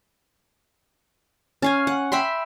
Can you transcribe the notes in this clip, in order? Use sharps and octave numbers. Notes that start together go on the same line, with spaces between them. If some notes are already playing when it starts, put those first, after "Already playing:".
C#4 F5 G#5
F#5
E5 G5 B5 C6